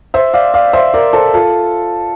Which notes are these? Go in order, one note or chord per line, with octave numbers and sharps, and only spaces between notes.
C5 E5
D5 F5
D5 F5
C5 E5
A#4 D5
A4 C5
F4 A4